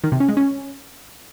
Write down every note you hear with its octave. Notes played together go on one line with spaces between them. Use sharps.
D#3
C3
C#4
G#3
C#4